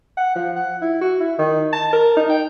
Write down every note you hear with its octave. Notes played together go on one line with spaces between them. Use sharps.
F#5
F3
F#5
E4
F#4
E4
D#3
A5
A#4
D#4
G5